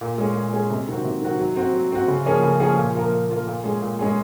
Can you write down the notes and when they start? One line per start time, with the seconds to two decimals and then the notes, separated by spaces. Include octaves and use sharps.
0.01 A#2
0.18 G#3 C#4 G#4
0.36 A#2
0.53 G#3 C#4 G#4
0.70 C3
0.88 D#3 F#3 C4 F#4
1.04 C3
1.22 D#3 F#3 C4 F#4
1.39 F#3
1.56 C4 F#4
1.73 F#3
1.92 C4 F#4
2.08 C#3
2.25 F3 A#3 C#4 G#4
2.43 C#3
2.60 F3 A#3 C#4 G#4
2.77 A#2
2.95 F3 A#3 F4 A#4
3.12 A#2
3.30 F3 A#3 F4 A#4
3.47 A#2
3.64 G#3 C#4 G#4
3.82 A#2
3.99 G#3 C#4 G#4